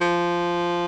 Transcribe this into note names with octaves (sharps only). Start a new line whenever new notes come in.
F3